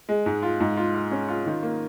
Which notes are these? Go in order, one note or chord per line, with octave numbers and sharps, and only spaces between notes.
G#3
G#2
F4
G#2
F4
F4
C#4
F4
D#3
A#3